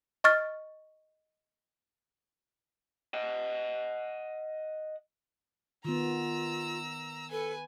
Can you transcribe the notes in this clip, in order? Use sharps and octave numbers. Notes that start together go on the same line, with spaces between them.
D#5 C#6 F6 A6
D#5 F#5
D#3 B3 F4 A#5 E6
A4 B4 G#5